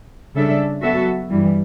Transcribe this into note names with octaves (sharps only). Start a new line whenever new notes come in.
C#3 G3 D4 A4 E5
F#3 B3 F#4 A4 E5
G2 E3 G3